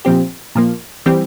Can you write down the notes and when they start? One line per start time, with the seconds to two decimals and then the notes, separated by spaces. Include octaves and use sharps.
0.05 A#2 F3 C4 G4
0.55 A#2 F3 A#3
1.06 E3 G3 C4 G4